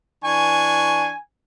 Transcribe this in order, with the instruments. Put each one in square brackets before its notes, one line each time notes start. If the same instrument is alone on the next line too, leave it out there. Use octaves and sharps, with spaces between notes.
[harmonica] E3 D4 C#6 [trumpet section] G#5